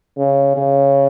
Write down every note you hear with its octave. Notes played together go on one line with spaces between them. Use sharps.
C#3
C#3